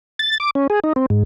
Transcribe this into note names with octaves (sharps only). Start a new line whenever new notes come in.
A6
D6
C#4
G#4
D#4
C4
G#2